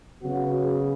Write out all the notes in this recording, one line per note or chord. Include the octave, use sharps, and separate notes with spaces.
C#3 F#3 B3 F#4
G#4